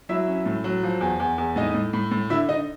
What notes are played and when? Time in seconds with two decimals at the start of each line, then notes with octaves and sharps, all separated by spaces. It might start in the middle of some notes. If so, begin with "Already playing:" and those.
0.09 F#3 E4 E5
0.28 C#4
0.46 A2
0.64 F#3
0.83 F3
1.01 E2
1.20 E2
1.38 E2
1.56 A2 D#4 D#5
1.74 A2
1.93 A2
2.11 A2
2.30 D3 E4 E5
2.49 D3 D#4 D#5